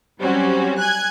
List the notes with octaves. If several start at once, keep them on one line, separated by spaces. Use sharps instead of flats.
F#3 G3 C4 C#4 F#4
G#5 F#6 G#6